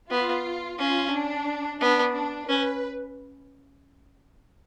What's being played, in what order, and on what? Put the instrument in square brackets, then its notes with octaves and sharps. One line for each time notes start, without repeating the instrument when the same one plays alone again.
[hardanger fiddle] B3 [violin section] F4
[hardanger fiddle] C#4 [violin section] F4
[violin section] D4
[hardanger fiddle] B3 [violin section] D4
[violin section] D4
[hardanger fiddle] C#4 [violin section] B4